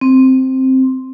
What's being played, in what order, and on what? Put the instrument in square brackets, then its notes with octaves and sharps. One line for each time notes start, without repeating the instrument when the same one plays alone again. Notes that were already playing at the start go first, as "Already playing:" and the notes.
[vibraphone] C4